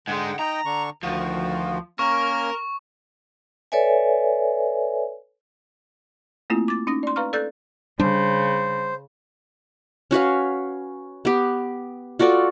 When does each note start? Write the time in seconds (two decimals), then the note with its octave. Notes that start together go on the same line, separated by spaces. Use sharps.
0.08 G#2 D3 G#3 F#5 G5
0.39 D#4 D#5 G5 A#5
0.65 D3 D4 C#6
1.03 D2 D#3 F3 F#4
1.99 A#3 C#4 A#4 C#6 F6
3.72 A4 B4 C#5 D5 E5 G#5
6.50 A3 A#3 C4 E4 F4
6.68 D6 A6
6.87 C#4 D#4 D#6 A#6
7.03 D5 C6
7.16 B4 F5 A#5 C#6 F6
7.33 A4 D5 E6 F#6 G6 A6
8.00 C#3 G3 D4 C5
10.11 C#4 F#4 B4 F5
11.25 B3 G4
12.19 F4 F#4 A4 D5